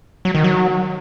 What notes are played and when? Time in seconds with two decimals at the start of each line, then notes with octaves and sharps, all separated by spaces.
0.25 F#3
0.35 D#3
0.44 F#3